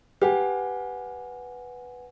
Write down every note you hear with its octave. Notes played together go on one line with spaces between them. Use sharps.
G4 B4 F#5 G#5